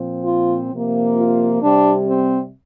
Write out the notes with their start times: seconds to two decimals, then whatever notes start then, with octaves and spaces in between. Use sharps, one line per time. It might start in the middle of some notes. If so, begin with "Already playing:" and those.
Already playing: A#2 F3 C4
0.24 F4
0.70 C3 F3 A#3
1.15 F4
1.61 C3 G3 C4 D4
2.07 C4